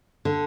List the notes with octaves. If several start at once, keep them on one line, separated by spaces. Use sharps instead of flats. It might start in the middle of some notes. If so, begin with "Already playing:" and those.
D3